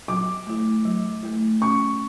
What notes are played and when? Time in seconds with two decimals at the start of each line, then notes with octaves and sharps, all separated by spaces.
0.08 F#3 D6
0.47 A3 E4
0.85 F#3
1.23 A3 E4
1.61 C#4 C#6